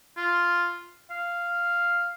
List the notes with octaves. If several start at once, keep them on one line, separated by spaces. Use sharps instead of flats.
F4
F5